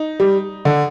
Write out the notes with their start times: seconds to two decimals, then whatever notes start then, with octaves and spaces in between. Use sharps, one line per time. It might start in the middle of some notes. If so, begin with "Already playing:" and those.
Already playing: D#4
0.20 G3
0.65 D3